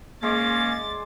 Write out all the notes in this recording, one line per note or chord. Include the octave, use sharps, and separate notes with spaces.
G#3 A#3 C#4 D5 A6